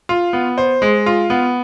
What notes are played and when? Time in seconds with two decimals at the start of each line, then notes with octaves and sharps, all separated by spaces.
0.09 F4
0.33 B3
0.58 C5
0.82 G#3
1.06 F4
1.30 B3